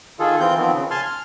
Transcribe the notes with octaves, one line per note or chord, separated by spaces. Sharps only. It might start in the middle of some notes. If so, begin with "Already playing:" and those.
D#3 F4 G#4 A4
E3 C4 F4 G6
D#3 F3 B3 C4
C#3
G#5 A5 C6 F6
F6